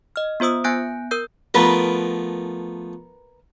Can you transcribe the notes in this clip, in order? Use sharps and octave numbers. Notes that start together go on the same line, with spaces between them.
D#5 F6
B3 F4 C5 D#6 E6
B3 G#5 F#6 G6 A#6 D7
A#4 E6 G6
F3 A3 B3 A#4 B4